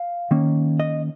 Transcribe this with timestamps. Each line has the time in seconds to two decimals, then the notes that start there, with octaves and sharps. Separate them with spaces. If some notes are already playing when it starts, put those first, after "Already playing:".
Already playing: F5
0.31 D#3 A#3 C#4
0.80 D#5